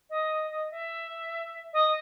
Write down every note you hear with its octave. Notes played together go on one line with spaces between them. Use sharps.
D#5
D#5
E5
D#5